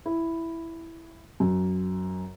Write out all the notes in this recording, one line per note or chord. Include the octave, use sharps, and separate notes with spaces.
E4
F#2